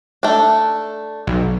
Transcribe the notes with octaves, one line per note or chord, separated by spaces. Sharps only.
A3 D4
B1